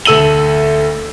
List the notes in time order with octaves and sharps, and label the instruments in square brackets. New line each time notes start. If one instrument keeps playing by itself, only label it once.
[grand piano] D2 A4 E6 D#7 F#7